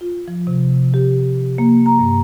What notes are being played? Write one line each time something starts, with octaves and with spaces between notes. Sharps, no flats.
F4
F3
C3
G4
A#3
A#5
G2